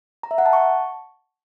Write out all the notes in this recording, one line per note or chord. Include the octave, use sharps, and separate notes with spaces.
A#5
E5
F#5
A5
C#6